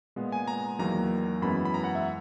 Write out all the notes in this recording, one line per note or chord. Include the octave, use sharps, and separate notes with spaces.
A#2 G#3 B3
G#5
A#5
E2 D#3 F#3 A#3 A#5
F#2 E3 G#3 B3 B5
B5
A#5
F#5
E5